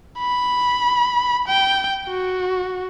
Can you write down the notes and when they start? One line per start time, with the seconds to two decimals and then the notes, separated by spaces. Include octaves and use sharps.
0.19 B5
1.48 G5
2.08 F#4